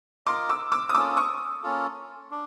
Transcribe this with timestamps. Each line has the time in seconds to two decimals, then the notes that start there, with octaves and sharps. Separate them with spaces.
0.26 F4 A#4 D#5 C6 D6
0.49 D6 E6
0.72 D6 E6
0.89 D#6
0.95 A#3 C#4 F4 A4 D6 E6
1.17 C#6 D#6
1.63 A#3 C#4 F4 A4
2.31 D4